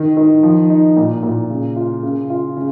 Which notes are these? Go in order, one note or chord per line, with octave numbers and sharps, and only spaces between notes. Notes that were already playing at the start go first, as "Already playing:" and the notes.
Already playing: D#3
D#3
F3
D#4
A#2
A#2
C#3
F4
C#3
F4
C#3